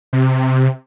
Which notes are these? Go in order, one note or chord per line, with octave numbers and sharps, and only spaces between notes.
C3